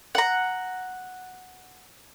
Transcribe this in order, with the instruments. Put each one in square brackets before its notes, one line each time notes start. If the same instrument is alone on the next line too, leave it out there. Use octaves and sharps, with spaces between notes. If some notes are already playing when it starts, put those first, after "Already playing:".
[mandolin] F#5 A#5